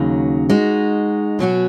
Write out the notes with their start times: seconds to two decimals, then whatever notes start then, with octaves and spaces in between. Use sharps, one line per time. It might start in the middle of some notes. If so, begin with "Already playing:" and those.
Already playing: D#2 C#3 F#3 D#4
0.50 G#3 D#4 F#4
1.39 B2 F#3 C#4 F#4